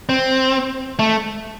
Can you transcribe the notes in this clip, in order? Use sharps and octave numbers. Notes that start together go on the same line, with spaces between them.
C4
A3